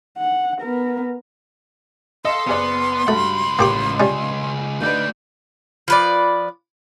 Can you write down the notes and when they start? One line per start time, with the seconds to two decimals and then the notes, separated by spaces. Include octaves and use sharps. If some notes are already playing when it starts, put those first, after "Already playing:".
0.18 F#5
0.61 B3 A#4
2.25 A4 D#5 F5 C6
2.47 F#1 B3 G#4 D5
3.08 C#2 G2 A3 F#4 B5
3.59 A1 A#3 G4 D6
4.00 G3 C#4 G#5
4.82 D3 A3 D#4 B4 D5 G6
5.88 F3 B4 D5